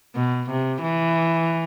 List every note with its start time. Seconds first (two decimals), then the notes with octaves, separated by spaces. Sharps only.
0.16 B2
0.50 C3
0.82 E3